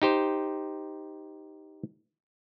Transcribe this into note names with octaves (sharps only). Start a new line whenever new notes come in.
D#4 G4 C5